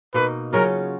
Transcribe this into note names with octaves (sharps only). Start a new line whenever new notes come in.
B2 A#3 D#4 B4
C#3 F#3 C#4 F4 A#4